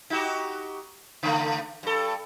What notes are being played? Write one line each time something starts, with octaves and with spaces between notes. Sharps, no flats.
D#4 F#4 G4
C#3 A3
G2 A4